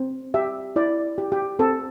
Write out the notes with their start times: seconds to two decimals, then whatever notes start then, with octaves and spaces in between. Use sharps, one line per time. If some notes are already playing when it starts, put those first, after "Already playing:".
Already playing: C4
0.34 G4 E5
0.76 E4 D5
1.18 G4
1.32 G4
1.59 C4 A4